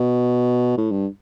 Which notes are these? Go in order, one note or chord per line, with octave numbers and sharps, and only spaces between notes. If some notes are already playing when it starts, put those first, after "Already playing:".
Already playing: B2
A2
G2